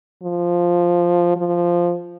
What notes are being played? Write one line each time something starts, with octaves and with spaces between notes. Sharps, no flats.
F3
F3